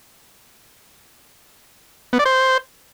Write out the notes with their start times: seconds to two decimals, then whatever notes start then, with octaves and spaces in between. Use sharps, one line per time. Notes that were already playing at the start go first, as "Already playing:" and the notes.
2.13 B3
2.19 D5
2.26 C5